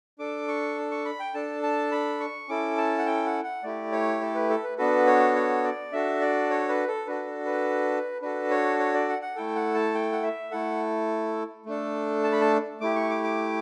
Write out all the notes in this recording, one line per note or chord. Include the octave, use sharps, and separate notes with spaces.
D4 A4 D6
C#6
C#6
B5
G5
D4 A4 A5
A5
B5
C#6
C#4 E4 A4 D6
A5
F#5
G5
F#5
F#5
A3 E4 G4 D5
C#5
A4
B4
A4
B4
B3 D4 F#4 A4 B4
C#5
C#5
D5
D4 F#4 A4 E5
D5
C#5
B4
A4
D4 F#4 A4 B4
B4
D4 F#4 A4 B4
C#5
C#5
D5
F#5
F#5
A3 E4 A4 G5
F#5
A5
G5
F#5
E5
A3 E4 A4 F#5
A3 D4 A4
A5
B5
A5
A3 E4 G4 D6
C#6
D6
D6